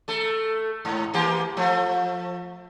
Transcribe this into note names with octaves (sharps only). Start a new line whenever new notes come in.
A3 A4
G#2
E3 A#3 G4
F3 A3